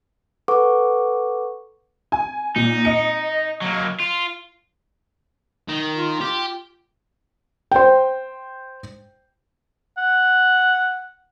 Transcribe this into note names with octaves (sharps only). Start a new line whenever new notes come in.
A4 B4 F#5 C#6 D6
G#5
A#2 D#4
D#5 C#7
F#3 A#3
F4
D#3
F4
G4
C5 G5
F#5